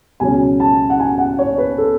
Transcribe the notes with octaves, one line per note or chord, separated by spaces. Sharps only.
C#2 B2 F#3 C#4 G#5
A5
F#5
G#5
F#5
C#5
B4
A4